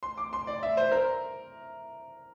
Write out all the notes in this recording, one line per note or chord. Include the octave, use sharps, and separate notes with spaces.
C6
D6
C6
D5
E5
C5
A#4